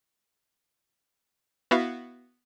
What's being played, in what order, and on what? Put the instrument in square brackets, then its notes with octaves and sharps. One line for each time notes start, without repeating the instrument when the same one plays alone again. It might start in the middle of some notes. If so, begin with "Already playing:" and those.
[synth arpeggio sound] B3 E4 F#4 E5 F5